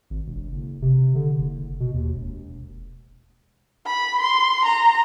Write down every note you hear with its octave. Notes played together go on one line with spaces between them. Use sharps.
G#1
E1
F#1
C3
D3
F#1
B2
D#2
E1
B5
C6
A#5